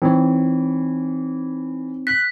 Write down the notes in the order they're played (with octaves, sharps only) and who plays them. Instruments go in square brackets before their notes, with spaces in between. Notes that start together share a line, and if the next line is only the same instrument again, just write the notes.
[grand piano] E3 [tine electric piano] C4 D#4 C#5
[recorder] F#6 [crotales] B6